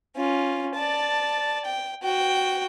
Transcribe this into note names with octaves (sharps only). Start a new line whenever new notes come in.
C#4 F4
D5 A5
G5
F#4 G5